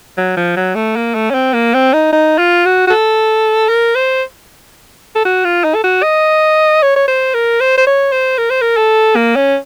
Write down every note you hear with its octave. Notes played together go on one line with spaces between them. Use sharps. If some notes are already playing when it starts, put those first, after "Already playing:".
F#3
F3
F#3
A3
A#3
A3
C#4
C4
A#3
C4
D#4
D#4
F4
F#4
F#4
A4
A#4
C5
A4
F#4
F4
D#4
A4
F#4
D#5
C#5
C#5
C5
A#4
C5
C5
C#5
C5
A#4
C5
A#4
A4
A#3
C#4